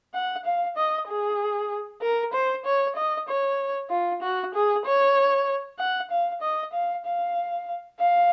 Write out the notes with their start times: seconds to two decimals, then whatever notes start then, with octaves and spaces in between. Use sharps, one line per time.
0.14 F#5
0.45 F5
0.77 D#5
1.08 G#4
2.02 A#4
2.33 C5
2.66 C#5
2.96 D#5
3.29 C#5
3.90 F4
4.22 F#4
4.54 G#4
4.86 C#5
5.79 F#5
6.11 F5
6.42 D#5
6.73 F5
7.06 F5
8.00 F5